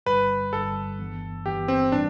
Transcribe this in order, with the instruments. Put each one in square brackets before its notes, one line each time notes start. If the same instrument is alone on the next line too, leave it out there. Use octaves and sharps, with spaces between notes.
[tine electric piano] G1 G2 D3 G3 [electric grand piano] B4
[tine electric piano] G1 G2 D3 G3 [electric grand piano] A4
[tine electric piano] G1 G2 E3 B3
[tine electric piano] G1 G2 E3 B3 [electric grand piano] G4
[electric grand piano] C4
[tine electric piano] A2 E3 G3 [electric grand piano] D4